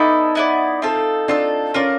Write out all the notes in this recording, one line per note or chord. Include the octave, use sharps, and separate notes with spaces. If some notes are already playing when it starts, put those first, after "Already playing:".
Already playing: B3 D#4 E4 A4 D5
B3 E4 A4 D5
C4 F4 A4
C4 D4 F4 A4
C#4 F4 A#4 D5